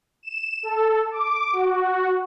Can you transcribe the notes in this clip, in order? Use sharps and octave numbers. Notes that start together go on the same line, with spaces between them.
E7
A4
D6
F#4